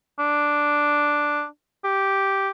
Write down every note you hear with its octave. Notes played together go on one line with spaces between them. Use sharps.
D4
G4